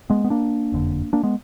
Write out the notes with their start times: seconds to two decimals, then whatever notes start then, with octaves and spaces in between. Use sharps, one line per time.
0.10 G#3 B3
0.24 B3
0.30 A#3 D4
0.72 F#1 F2 D3
1.13 A#3 D4
1.23 G#3 B3